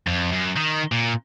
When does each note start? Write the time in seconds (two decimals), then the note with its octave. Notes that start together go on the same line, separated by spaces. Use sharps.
0.07 F2
0.32 F#2
0.57 D#3
0.92 A#2